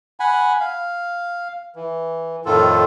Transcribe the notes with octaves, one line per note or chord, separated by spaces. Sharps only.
F#5 G#5 B5
F5
E3
F2 A2 D#3 F4 A4